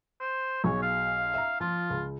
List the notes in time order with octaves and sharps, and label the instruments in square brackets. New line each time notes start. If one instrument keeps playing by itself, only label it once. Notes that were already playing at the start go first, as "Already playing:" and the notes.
[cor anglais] C5
[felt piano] B1 G#4 [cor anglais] C#5
[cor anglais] F5
[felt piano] E5 A#5
[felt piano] F3 [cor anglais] F4
[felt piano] C#2